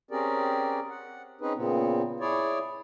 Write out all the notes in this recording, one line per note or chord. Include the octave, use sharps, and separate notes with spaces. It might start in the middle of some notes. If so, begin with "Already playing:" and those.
C4 C#4 G4 G#4 A#4 D5
F#5
C4 C#4 D#4 G#4 B4
A#2 C#3 B3 C4
E4 G#4 C#5 D5